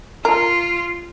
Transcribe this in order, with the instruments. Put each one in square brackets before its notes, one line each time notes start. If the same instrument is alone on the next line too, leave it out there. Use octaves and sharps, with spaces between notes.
[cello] F4 [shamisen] A#4